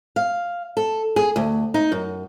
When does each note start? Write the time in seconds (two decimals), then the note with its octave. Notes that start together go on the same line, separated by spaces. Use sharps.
0.16 F5
0.77 A4
1.16 G#4
1.36 D2
1.74 D#4
1.92 F#2